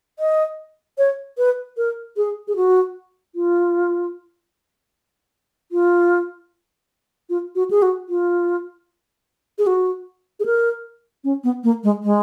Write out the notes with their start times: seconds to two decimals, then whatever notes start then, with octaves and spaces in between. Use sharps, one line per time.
0.19 D#5
0.98 C#5
1.38 B4
1.77 A#4
2.17 G#4
2.48 G#4
2.56 F#4
3.35 F4
5.72 F4
7.30 F4
7.55 F#4
7.71 G#4
7.82 F#4
8.09 F4
9.58 G#4
9.67 F#4
10.40 G#4
10.46 A#4
11.24 C#4
11.44 B3
11.64 A#3
11.84 G#3
12.04 G#3